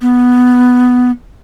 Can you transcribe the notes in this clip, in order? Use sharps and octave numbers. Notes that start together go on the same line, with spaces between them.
B3